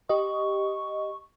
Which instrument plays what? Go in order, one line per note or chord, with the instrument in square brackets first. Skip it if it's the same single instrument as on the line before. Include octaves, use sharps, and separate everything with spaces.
[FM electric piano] G4 D#5 [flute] C#6